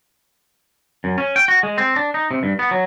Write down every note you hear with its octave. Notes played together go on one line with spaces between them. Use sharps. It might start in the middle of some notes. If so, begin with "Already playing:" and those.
F#2
C#4
G5
F#4
G#3
C4
D4
D#4
C3
G2
B3
F#3